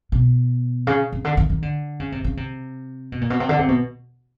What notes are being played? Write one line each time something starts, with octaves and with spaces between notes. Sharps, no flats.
B2
C#3
C#3
D3
D#3
D#3
D3
C#3
C3
C#3
C3
B2
A#2
B2
C3
D3
C3
B2